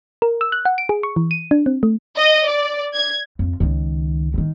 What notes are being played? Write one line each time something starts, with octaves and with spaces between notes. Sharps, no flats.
A#4
E6
F#6
F#5
D7
G#4
C#6
E3
D#7
D4
C4
A3
D#5
D5
G#6
F2
C#2 D#3
G2 D#3